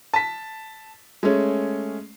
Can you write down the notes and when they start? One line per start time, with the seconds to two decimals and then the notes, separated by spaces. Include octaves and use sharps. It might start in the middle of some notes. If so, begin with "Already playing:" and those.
0.14 A5 B6
1.23 G#3 A3 C#4